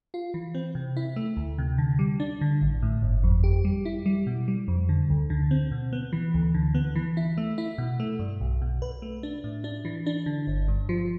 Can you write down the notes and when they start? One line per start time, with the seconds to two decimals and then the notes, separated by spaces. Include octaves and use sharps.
0.14 F4
0.34 E3
0.55 C4
0.75 C3
0.97 E4
1.16 A3
1.37 D2
1.58 C3
1.78 D3
1.99 G3
2.20 D4
2.41 D3
2.62 A1
2.82 A2
3.02 G1
3.24 F2
3.44 G4
3.65 G3
3.85 E4
4.06 G3
4.27 B2
4.48 G3
4.68 F2
4.89 D3
5.10 D2
5.30 D3
5.51 C4
5.71 B2
5.93 B3
6.13 E3
6.34 D2
6.54 D3
6.74 B3
6.95 E3
7.17 E4
7.37 A3
7.58 E4
7.78 B2
8.00 A3
8.19 G2
8.41 B1
8.62 B2
8.82 B4
9.02 A3
9.23 D4
9.44 A2
9.64 D4
9.85 E3
10.06 D4
10.26 D3
10.47 G1
10.68 G2
10.89 F3